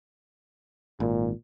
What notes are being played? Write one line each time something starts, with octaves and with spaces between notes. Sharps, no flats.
G#1 A#2